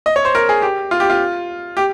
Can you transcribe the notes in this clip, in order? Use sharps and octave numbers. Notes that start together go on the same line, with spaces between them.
D#5
C#5
C5
A#4
G#4
G4
F4
G4
F4
G4